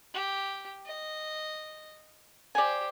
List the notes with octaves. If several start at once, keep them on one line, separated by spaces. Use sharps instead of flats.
G4
D#5
G4 C5 D5 G#5